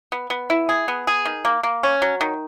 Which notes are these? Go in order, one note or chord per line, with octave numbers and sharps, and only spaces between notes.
B3
B3
E4
G#4
B3
G#4
D#3
A#3
A#3
C#4
F#3
D#3